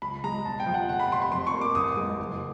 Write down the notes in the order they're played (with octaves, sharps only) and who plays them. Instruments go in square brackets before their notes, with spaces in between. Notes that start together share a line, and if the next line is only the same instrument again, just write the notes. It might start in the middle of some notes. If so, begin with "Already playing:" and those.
[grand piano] C#2 B5
G#3 A#5
E1 A5
G5
F3
F#5
F1 F#5
B5
F1 C6
B5
F2 C6
C#6
A#3
D6
A1 D#6
G#3
F#1